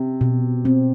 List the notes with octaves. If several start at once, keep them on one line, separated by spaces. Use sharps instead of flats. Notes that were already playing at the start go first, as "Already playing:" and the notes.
Already playing: C3
B2
C4